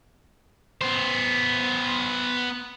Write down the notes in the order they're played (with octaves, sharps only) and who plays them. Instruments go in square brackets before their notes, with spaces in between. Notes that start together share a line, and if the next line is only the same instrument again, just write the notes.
[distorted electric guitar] B3 C5